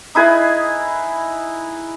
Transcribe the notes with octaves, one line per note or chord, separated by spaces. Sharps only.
D#4 E4 G#4 B4